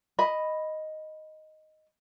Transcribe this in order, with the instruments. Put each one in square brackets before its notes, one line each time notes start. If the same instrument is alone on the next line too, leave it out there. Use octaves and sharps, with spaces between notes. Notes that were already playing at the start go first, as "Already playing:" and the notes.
[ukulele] D#5 B5